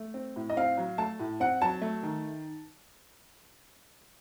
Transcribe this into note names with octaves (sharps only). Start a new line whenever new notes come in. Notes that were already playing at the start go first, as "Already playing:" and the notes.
Already playing: A3
C4
A2
D#5
C4 F5
F#3
A3 A5
A2
C4 F#5
F#3 A5
A3
D#3